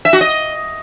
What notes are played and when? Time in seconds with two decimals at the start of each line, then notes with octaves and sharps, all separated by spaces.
0.05 E5
0.13 F#4
0.21 D#5